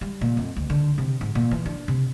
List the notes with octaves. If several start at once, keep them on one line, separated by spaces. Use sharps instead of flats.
G3
A#2
F2
D2
D3
C3
G#2
A#2
E3
D4
C3